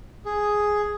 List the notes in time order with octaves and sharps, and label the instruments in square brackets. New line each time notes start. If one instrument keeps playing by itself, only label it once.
[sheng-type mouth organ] G#4